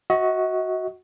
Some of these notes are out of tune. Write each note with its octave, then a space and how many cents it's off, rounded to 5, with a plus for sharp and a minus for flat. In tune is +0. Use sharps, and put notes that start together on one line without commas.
F#4 +0 D#5 +40